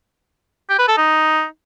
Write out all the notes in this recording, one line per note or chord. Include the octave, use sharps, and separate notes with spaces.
G4
B4
A4
D#4